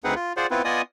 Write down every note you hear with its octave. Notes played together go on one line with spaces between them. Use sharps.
D2 C4 D#4 G#4 B4 F#5
F4
F4 G#4 C5 D5 F#5
B3 C4 E4 F4 B4
B3 F4 D5 D#5 G#5 D#6